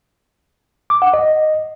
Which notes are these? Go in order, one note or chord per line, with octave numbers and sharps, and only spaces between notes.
D6
F#5
D#5